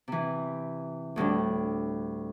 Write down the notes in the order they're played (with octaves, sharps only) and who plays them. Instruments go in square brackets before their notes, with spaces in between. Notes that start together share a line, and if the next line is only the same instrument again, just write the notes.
[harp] C3 E3
D2 A2 G3 D4